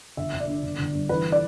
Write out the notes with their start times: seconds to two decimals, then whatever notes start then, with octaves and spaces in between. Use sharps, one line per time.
0.17 G1 E5
0.33 G1
0.40 D5
0.47 D3
0.63 G1
0.79 G1
0.94 G2
1.09 E3 B4
1.32 D5